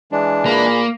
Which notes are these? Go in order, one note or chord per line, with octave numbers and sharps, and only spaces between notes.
E3 G#3 D4
A#2 A#3 G#4 B5